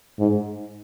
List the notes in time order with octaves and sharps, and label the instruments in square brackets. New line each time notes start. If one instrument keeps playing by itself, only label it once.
[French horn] G#2